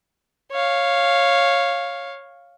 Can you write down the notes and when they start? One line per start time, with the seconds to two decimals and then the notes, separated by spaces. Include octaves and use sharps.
0.51 C#5 F5